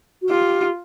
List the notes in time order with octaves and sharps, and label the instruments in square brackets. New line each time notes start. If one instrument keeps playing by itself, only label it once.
[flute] F#4
[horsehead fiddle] F4 [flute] G4